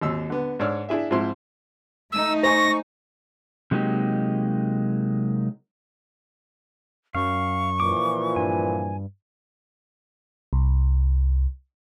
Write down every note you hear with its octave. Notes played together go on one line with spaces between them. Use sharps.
G#1 D#2 E6
D3 B3
G#2 D4 C#5 D5 E6 F6
D4 E4 G#4 E5
G#2 F3 C4 E4 C6
A3 D#4 E6
C5 G#5 C#6 A#6
C3 F#3 G#3 A#3 D#4 G4
F#2 F5 C#6
A#2 E3 F3 D6
G2 G#5
C2